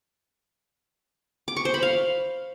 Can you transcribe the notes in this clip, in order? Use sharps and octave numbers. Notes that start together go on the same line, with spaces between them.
D6
C#6
C5
B5
F5